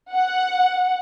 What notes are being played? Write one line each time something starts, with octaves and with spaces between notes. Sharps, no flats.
F#5